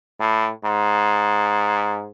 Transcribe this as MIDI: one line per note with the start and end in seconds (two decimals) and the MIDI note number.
0.20 0.50 45
0.64 2.10 44